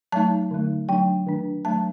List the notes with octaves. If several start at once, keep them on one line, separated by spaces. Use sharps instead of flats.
F#3 A3 D#4 A5
D3 F#3 A3 D#4
F#3 A3 D4 G5
D#3 A3 D4
D#3 F#3 A3 D4 A5